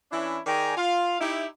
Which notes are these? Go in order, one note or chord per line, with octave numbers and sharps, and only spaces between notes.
E3 C#4 D4 E4
D#3 G#4 D5 G5 G#5 A#5
F4 F5
D#4 E4 G4